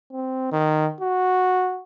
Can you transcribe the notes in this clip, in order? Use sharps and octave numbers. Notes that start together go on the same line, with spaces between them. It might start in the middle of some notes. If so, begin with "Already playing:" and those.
C4
D#3
F#4